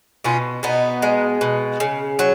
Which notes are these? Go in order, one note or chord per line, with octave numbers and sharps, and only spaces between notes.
B2 C#4 F4
B2 B3 D#4
G#3
B2
C#3
F#3